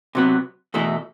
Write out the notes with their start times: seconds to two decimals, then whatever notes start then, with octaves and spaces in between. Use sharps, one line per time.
0.15 C3 F#3 B3
0.74 E2 B2 A3 E4